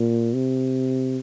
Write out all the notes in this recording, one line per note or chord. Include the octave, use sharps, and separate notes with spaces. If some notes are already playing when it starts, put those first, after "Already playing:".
Already playing: A#2
C3